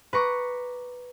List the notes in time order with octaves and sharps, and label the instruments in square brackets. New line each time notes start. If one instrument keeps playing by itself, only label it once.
[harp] B4 A#5 C#6 D6